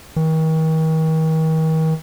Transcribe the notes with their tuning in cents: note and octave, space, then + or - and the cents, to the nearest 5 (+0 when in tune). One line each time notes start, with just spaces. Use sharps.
D#3 +40